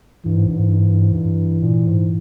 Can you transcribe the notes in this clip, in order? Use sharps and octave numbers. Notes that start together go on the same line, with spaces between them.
G2 E3
G#2
G2
G#2
G2
G#2
G2
G#2
G2
A#2
G#2